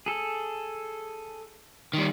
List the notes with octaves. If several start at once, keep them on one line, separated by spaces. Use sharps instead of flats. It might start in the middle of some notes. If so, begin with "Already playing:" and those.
G#4 A4
D#3 G3